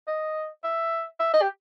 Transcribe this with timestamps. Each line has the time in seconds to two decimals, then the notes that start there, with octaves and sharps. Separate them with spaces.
0.08 D#5
0.64 E5
1.20 E5
1.34 D#5
1.42 G4